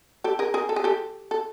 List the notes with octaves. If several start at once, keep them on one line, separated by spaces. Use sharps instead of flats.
G4 A4
G#4 A#4
G#4 A#4
A4
G#4
G4 A4
A4